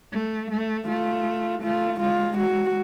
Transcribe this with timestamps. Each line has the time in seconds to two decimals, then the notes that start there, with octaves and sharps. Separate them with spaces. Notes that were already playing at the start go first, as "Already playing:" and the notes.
0.14 A3
0.51 A3
0.88 A3 F4
1.63 A3 F4
2.01 G#3 F4
2.39 F#4